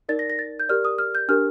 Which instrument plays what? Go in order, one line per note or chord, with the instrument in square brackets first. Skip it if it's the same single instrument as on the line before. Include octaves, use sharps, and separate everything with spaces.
[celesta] D#4 A#4 D5 A6
A#6
A#6
A6
G6
G4 A#4 D5 F6
D#6
F6
G6
D4 G4 A#4 F6